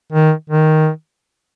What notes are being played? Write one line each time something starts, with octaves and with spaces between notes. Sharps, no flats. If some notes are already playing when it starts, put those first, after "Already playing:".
D#3
D#3